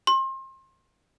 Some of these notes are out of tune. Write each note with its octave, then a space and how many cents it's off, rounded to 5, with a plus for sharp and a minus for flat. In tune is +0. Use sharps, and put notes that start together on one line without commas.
C6 +30